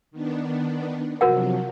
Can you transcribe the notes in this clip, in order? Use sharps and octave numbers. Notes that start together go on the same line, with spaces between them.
D#3 B3 D4
C3 F3 F#3 F#4 A#4 F#5